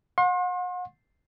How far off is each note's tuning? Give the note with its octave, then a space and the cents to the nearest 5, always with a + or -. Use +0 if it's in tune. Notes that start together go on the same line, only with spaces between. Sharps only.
F#5 -40 C6 +40